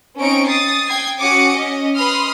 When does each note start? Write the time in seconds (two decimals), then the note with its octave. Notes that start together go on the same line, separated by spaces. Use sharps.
0.19 C4 C#4 D#4 C#6 D7
0.48 D#6 A6 C7
0.86 G5 G#6 C7
1.19 C#4 F#4 D6 D#6 C#7 D7
1.54 C#4 D#5
1.96 B4 B5 C6 D#6 F6